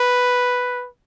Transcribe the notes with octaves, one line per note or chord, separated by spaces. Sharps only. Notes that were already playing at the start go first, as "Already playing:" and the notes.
Already playing: B4